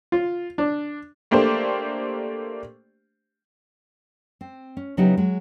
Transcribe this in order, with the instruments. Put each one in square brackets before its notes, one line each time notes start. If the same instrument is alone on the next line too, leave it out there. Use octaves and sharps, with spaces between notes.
[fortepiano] F4
D4
[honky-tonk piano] A3 A#3 D4 G4 C5
[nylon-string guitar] C4
C#4
C#3 F#3 B3 D#4 E4 G4
F#3 G#3